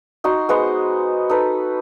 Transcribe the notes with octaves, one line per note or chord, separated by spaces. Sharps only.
D#4 F#4 C6
G#3 B3 C5 F#5
D#4 A4 B4